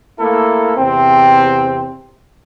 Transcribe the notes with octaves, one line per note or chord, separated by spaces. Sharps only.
A3 A#3 E4 A4
E2 C3 C4